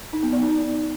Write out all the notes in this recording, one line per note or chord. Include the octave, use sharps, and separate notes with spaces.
D#4
B3
D5
D#4